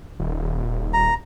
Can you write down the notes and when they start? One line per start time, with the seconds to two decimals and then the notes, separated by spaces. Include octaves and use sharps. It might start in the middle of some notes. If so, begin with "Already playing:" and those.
0.19 D#1
0.93 A#5